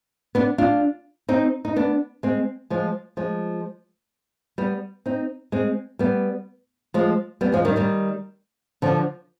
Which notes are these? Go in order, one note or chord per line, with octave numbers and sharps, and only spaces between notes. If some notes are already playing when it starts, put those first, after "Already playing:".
B3 D4
D4 F4
C4 D#4
D#4
B3 D4
G#3 C4
F3 G#3
F3 G#3
G3 B3
C4 D#4
G#3 C4
G3 B3
F3 G#3
G3 B3
F3 G#3
D#3 G3
D#3 G3
D3 F3